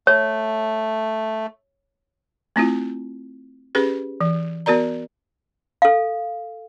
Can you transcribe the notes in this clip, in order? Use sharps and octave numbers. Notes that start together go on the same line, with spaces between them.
A3 C#5
A3 C4 E4 F4
C#4 G4 G#4 B4
E3
B3 F#4 A#4 D5 A#5
A4 F5